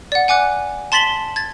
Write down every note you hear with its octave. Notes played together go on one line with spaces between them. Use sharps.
D5 F#5
F#5 G#5 D6 F#6
A5 C6 A6 B6 F#7 G7
G#6 A6